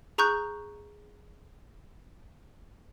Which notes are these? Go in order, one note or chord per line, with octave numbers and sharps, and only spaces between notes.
G#4 A#5 C#6 F#6 G6